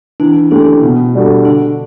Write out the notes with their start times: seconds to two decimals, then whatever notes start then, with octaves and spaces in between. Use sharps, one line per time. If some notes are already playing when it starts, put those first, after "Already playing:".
0.20 E3 D4
0.50 A3 C#4 D4 G4
0.82 B2
1.15 G3 D4 F#4 A4
1.45 D3 D4